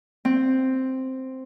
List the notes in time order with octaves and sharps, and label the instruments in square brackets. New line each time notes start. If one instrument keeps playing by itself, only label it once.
[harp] C4